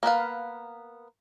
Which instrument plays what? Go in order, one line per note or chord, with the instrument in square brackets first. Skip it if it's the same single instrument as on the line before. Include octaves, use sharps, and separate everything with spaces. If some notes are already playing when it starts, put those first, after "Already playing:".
[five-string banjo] A#3 B3 B4 F5